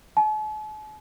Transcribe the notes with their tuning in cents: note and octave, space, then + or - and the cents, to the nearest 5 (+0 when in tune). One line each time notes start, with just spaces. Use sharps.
A5 -45